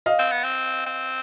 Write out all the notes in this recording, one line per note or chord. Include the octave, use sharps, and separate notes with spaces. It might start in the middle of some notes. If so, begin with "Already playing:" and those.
D#5 F5
C4
B3
C4
C4